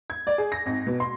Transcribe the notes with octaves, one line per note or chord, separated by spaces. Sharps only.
G#6
D5
G#4
A#6
G#1
B2
C6